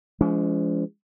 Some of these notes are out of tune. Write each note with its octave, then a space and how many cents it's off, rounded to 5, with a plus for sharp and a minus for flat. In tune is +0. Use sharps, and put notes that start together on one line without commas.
F3 -35 G#3 +5 C#4 +40